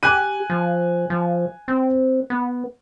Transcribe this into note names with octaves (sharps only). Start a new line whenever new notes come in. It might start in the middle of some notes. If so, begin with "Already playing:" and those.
G4 G#5 F#6 D#7
F3
F3
C4
B3